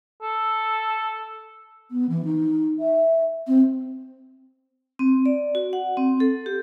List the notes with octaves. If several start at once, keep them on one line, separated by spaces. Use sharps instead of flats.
A4
B3
E3
D#4
E5
C4
C4
D5
F#4
F#5
C4
A4
G4